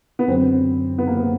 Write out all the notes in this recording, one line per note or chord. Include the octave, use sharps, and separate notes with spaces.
B3
F#2 D3 F#3 C4
B3
A#3
B3